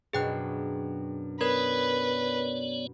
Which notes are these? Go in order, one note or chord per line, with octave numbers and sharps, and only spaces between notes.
F#2 B2 D4 G#4 G5 F#6
B3 A#4 B4 C#5 D5 G#6